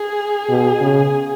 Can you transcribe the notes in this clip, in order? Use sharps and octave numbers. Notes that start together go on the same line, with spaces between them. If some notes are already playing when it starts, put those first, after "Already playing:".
Already playing: G#4
B2
C#3